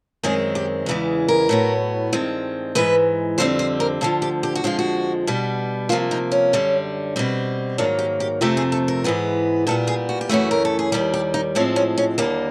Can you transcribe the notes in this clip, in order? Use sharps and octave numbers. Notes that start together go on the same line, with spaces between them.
F#2 D#3 G#3 C4 G#4
G4
E2 C#3 E3 G#3
A#4
A2 F#3 B3
G2 D#3 G#3 C4
G#2 E3 G#3 B4
F2 D3 G3 C4 C5
C5
A#4
D2 D3 F3 A4
G4
G4
F#4
F2 D3 F3 G#3 F4
F#4
B2 G3 B3
C3 F3 A#3 F4
D#4
C#4
F#2 D3 G3
B2 G3 C4
G#2 D#3 F#3 A#3 D4
G4
G4
F2 C3 F3 A3 C4 G4
G#4
A4
A#4
G#2 E3 G#3 B3
A#2 G3 B3 A4
G#4
F#4
G4
F#2 C#3 E3 A3 F#4
A#4
A4
G#4
D#2 D#3 G3 G4
G4
D#4
A2 F3 G#3 C4 C#4
C#4
C#4
D#2 D3 G3 A#3 G4